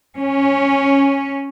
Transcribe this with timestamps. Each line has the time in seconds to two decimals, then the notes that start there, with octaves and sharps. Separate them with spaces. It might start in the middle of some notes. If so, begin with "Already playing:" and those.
0.17 C#4